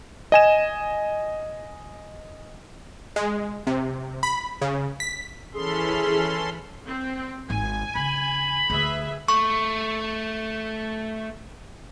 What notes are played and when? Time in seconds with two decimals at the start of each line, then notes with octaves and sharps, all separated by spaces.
0.32 D#5 G#5 E7
3.16 G#3
3.67 C3
4.23 B5
4.62 C#3
5.00 B6
5.54 E3 C#4 G#4 A4 B5 C6 F6
6.87 C4
7.50 G#1 G#2 G#5
7.95 C#3 B5
8.70 D2 G#4 B4 E5
9.28 A3 C#6